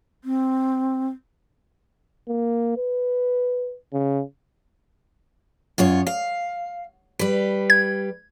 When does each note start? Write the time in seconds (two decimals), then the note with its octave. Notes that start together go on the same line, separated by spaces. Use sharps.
0.24 C4
2.28 A#3
2.77 B4
3.93 C#3
5.78 F#2 F4 C#5
6.07 F5
7.19 G3 B4
7.70 G#6